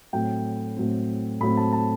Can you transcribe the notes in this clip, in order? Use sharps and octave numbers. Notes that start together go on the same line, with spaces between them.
A2 F#3 C4 G5
A2 F#3 C4
A2 F#3 C4 B5
A5
A5